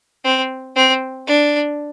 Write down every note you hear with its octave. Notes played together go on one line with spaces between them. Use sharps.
C4
C4
D4